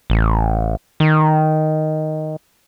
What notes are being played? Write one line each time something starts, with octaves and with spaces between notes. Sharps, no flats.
A1
D#3